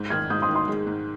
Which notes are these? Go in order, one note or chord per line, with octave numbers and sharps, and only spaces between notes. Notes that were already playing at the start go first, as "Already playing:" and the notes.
Already playing: G#2
D#3 F6 G#6
G#2 D#6 G6
C6 D#6
D#3
C6 D#6
G#3
G#2